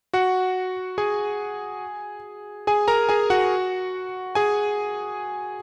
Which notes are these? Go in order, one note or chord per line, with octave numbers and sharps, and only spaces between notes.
F#4 F#5
G#4 G#5
G#4 G#5
A#4 A#5
G#4 G#5
F#4 F#5
G#4 G#5